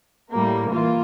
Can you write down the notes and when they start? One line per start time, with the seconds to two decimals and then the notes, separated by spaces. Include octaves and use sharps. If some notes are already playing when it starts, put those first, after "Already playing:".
0.32 A2 G3 A#3
0.72 E3 A#3 F4